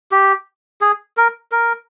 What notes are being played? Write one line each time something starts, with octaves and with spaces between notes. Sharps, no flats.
G4
G#4
A#4
A#4